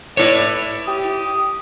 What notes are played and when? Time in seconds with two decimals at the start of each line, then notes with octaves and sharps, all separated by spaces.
0.17 A2 E4 B4 C#5 D5
0.87 G4 D#6